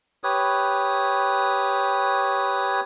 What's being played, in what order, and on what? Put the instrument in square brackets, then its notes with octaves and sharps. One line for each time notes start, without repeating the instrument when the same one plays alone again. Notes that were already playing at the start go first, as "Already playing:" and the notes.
[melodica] G4 B4 C#5 D#6